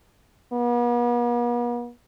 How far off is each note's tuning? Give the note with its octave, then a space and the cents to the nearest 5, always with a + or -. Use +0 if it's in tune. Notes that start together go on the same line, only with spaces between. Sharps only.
B3 -45